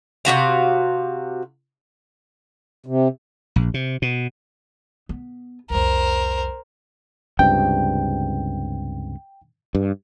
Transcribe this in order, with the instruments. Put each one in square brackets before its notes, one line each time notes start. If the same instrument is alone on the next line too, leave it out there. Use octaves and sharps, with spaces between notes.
[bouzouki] C3 A#3 F#4 F5
[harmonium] C3
[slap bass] A#1
C3
B2
[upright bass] B3
[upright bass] C2 F2 [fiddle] A#4 C5
[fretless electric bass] C#2 G2 C3 [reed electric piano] G5
[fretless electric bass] G2